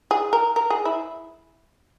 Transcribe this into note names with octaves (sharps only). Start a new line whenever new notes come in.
G#4
A#4
A#4
G#4
E4